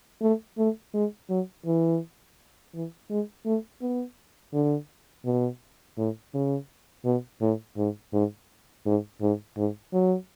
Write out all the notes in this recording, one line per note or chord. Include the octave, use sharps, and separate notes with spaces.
A3
A3
G#3
F#3
E3
E3
G#3
A3
B3
D3
B2
A2
C#3
B2
A2
G#2
G#2
G#2
G#2
G#2
F#3